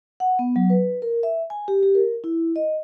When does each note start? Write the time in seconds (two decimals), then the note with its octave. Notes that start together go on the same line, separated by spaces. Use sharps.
0.20 F#5
0.39 B3
0.56 F#3
0.70 B4
1.02 A#4
1.23 E5
1.50 G#5
1.68 G4
1.83 G4
1.95 A#4
2.24 E4
2.56 D#5